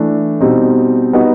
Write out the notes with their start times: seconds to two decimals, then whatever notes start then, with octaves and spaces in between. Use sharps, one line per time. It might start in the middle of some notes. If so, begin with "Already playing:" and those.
Already playing: E3 A3 D4
0.41 B2 G3 C4 D#4
1.13 G3 B3 D#4 F#4